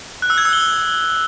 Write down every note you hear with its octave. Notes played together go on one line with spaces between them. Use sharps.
F#6
E6
G#6
E6
G7